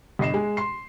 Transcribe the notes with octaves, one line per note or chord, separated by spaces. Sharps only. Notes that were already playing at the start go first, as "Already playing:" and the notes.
G1 D#5 C7 E7
G#3
C6 C7